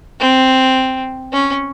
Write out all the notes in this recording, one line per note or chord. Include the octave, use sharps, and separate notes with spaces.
C4
C#4